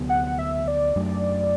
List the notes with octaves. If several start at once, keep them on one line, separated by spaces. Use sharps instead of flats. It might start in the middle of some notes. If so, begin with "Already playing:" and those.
Already playing: D2 C3 F#3 B3
F#5
E5
D5
F#2 F#3 A3 D4